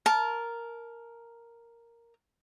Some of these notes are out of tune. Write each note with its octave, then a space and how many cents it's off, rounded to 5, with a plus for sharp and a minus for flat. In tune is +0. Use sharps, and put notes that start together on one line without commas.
A#4 +0 A5 -20